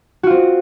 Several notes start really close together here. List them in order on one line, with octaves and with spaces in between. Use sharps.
F#4 F4 C4